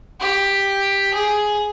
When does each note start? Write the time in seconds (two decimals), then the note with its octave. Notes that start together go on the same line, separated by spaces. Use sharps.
0.20 G4
1.14 G#4